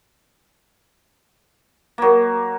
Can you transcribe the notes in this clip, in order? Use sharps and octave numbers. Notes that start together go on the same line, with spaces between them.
F#3 A#3